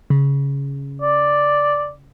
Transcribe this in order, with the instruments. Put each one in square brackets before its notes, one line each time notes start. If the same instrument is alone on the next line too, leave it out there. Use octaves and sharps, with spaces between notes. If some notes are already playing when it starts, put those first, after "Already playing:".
[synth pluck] C#3
[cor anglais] D5